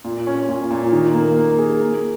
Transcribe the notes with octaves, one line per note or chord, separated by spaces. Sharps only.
A#2
C#4
A#2
A#2
D#3
A#3
A#3
G#4
A#3